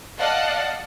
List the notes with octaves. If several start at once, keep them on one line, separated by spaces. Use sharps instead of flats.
D5 D#5 F5 F#5 A5